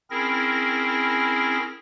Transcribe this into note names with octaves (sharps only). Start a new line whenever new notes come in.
C4 C#4 E4 G#4 A#4 A#6